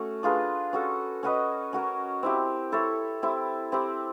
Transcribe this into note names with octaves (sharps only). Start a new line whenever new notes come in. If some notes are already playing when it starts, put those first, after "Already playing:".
Already playing: A3 C#4 F#4
D4 F4 G#4 B4
C#4 F#4 A4
C#4 F#4 B4 D#5
C#4 F#4 A#4
C4 E4 G4
E4 A4 C#5
C4 E4 G4
C4 E4 G4